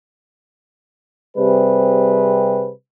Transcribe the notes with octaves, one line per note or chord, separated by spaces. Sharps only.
C3 G3 C4 G#4 B4